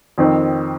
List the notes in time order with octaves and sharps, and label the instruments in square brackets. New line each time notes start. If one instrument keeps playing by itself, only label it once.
[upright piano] F2 D#3 C4